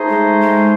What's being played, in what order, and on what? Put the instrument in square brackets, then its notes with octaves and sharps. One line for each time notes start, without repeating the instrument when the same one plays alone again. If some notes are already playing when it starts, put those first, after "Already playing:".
Already playing: [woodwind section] A3 D#4 G#4 C5
[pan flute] G#3
G#3